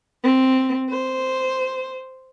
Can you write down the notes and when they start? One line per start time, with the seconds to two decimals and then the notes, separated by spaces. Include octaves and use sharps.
0.24 C4
0.90 C5